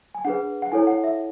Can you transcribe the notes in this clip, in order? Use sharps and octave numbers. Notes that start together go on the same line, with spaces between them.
G#5
D4 G#4 B4 F#5
F#5
E4 A4 C#5 G#5
F#5
E5